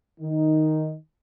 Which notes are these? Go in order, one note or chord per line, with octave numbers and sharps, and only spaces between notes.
D#3 D#4